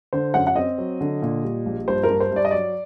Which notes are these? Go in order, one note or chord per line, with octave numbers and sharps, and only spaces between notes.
D3 C5
F#2 F#5
F#5
C4 D#5
F#3
D3
A#2
G3
A#1
G2 C5
A#4
G2
C5
G2 D5
D#5
F#3 D5